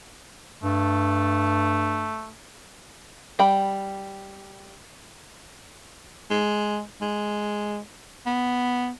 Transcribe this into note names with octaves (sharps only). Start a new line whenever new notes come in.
G2 A3
G3 G5 B5
G#3
G#3
B3